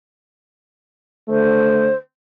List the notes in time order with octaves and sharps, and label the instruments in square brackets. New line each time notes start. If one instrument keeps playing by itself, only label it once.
[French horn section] D3 A3 [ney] C5